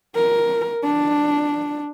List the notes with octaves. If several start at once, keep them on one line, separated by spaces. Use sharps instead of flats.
A#4
D4